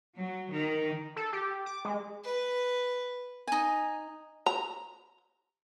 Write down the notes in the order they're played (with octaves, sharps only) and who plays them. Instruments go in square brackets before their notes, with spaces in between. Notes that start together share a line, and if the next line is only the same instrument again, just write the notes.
[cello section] F#3
D#3
[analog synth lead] A4
G4
D6
G#3
[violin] B4
[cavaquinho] D#4 G#5
[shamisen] A#5